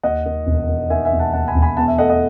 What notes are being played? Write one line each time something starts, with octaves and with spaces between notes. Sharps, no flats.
D#2 D#5 F#5
D#3
E1
D#3
D#3 E5 G#5
E5 G#5
E1
F#5 A5
D#2 F#5 A5
G#5 B5
E1
G#5 B5
E2 F#5 A5
E5 G#5
A3 D#5 F#5
D#5 F#5